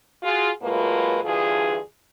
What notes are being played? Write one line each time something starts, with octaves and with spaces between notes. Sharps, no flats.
F4 F#4 G#4
A2 F#3 G#3 A#3 F4 B4
D2 G2 E3 F4 G#4